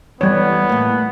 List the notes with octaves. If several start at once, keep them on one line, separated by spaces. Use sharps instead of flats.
E3 G3 B3 C#5
A2 A#3